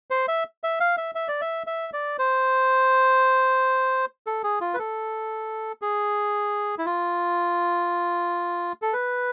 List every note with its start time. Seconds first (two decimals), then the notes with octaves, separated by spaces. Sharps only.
0.11 C5
0.28 E5
0.63 E5
0.80 F5
0.98 E5
1.15 E5
1.28 D5
1.41 E5
1.67 E5
1.93 D5
2.18 C5
4.27 A4
4.44 G#4
4.61 F4
4.74 B4
4.79 A4
5.82 G#4
6.78 E4
6.86 F4
8.82 A4
8.93 B4